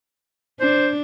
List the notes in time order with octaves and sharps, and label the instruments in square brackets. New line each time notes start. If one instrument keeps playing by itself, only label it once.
[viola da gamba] D4 [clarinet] C5